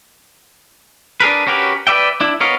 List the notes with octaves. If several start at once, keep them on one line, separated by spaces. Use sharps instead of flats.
D4 G#4 A#4 B4
C#4 F#4 G4 A#4 B4
B4 D5 E5 G5
D4 E4
B3 A#4 C#5 D#5 F5